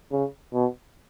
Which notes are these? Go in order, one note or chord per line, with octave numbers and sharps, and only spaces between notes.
C#3
B2